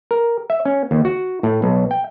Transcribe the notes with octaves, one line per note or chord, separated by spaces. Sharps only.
A#4
E5
C#4
D#2
F#4
A2
B1
G5